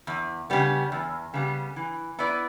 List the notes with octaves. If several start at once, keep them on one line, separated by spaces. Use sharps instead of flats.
E2
C#3 G3 B3
E2
C#3 G3 B3
E3
B3 E4 B4 D5